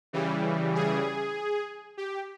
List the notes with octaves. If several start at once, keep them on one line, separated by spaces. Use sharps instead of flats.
C#3 E3 G3
G#4
G4